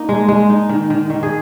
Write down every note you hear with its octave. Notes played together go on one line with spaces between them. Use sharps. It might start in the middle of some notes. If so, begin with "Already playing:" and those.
Already playing: A#3 D#4
G#3
G#3
D#4
D#3
D#3
D#3
G#4